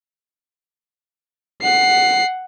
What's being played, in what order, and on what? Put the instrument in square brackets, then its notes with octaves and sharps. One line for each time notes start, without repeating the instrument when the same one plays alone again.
[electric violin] F#5 C7